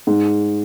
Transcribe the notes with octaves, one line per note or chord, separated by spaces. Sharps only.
G#2